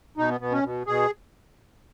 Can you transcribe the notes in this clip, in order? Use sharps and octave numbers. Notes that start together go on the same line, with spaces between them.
B2 D#4
B3
B2 B3
C#4
B2
B2 G#4